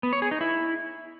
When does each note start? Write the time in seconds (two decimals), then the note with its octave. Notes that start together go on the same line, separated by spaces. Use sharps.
0.03 B3
0.13 C#5
0.22 G#4
0.31 D#4
0.41 E4